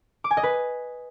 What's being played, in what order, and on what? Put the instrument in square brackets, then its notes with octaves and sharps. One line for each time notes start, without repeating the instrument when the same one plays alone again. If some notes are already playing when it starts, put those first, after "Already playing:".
[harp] D6
G#5
D#5
B4